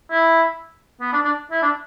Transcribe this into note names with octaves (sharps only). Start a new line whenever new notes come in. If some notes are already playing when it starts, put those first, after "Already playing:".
E4
B3
D4
D4
E4
D4